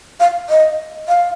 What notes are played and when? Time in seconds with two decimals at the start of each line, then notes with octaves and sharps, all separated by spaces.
0.20 F5
0.50 D#5
1.08 F5